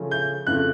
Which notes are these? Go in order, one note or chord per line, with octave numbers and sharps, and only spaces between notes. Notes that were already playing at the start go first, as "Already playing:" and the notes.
Already playing: C#3 F3 A3 C#4
G6
F2 C#3 F3 A3 F#6